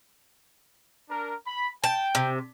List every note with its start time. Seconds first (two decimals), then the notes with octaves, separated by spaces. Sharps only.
1.09 D4 A#4
1.46 B5
1.84 G5 A5
2.15 C3